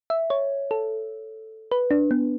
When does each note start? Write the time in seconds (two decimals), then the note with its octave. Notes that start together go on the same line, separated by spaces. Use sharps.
0.10 E5
0.30 C#5
0.71 A4
1.71 B4
1.91 D4
2.11 B3